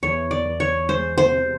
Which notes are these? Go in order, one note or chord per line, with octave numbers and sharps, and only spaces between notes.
E2 C#5
D5
E3
C#5
G#3 C5
C5
C3